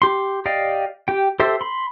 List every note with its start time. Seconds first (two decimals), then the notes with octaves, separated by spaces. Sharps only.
0.02 G4 C6
0.46 G4 D5 D#5 F5 G5
1.08 G4 G5
1.40 G4 A4 C5 E5
1.61 B5 C6